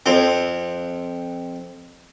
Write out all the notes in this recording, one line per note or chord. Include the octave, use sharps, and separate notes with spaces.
F2 C4